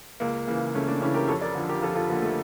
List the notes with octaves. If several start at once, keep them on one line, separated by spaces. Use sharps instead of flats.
C#2 A#3
C#3 E3 A#3
C#2 A3 C#4
A#3 D4
C#3 E3 C#4 E4
G4 A#4
F2 A4 C#5
A#4 D5
D3 F3
G4 A#4
F2 F4 A4
F4 A4
D3 F3 A#3
A3